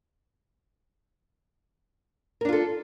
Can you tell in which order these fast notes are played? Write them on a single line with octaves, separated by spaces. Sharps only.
A#4 D4 F4 A4